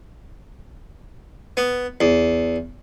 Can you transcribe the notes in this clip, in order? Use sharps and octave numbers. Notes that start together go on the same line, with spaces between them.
B3
E2